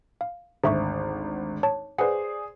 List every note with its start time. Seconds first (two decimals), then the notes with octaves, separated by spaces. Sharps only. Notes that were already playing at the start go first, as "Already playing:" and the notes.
0.21 F5
0.64 G#1 D2 C5 E5 C#6
1.63 C#5 A5
1.98 G#4 B4 C5 D5 F#5